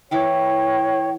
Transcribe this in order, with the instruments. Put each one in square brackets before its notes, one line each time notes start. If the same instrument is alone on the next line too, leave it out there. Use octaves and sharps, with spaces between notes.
[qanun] E3 E4 D6 [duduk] C#5 [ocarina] G5